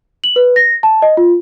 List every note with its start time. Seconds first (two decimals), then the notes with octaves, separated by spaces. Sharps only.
0.24 F#7
0.36 B4
0.56 A#6
0.83 A5
1.02 D#5
1.17 F4